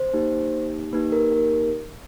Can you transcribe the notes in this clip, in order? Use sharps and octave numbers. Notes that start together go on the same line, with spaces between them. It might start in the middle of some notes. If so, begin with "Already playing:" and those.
Already playing: C5
A#3 D#4 G4
A#3 D#4 G4 B4
A#4
A#4